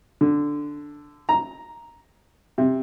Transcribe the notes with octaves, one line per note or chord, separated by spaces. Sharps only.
D3
A#5
C3